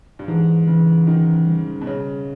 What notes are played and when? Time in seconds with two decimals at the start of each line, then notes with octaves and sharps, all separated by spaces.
0.19 G2
0.28 G#2 E3
0.67 C#3 E3
1.07 D#3 C#4
1.47 G3
1.81 B2
1.87 C#3 C#5